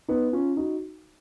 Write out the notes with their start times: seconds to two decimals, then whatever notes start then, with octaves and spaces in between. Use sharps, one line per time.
0.08 B3 D#4
0.33 C#4 F4
0.57 D#4 F#4